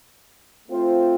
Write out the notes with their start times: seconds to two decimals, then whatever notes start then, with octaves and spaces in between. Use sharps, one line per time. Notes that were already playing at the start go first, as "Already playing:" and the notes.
0.68 A3 C4 F4 C5